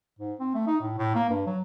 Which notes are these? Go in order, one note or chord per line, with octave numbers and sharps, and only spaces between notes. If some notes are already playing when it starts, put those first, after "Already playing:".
G#2
C4
A3
D#4
A2
A2
A#3
G2
F#3